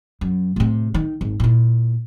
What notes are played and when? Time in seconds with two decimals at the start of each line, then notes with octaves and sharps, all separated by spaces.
0.21 F#2
0.56 A2 C3
0.94 D#3
1.21 G#1
1.40 A#2 E4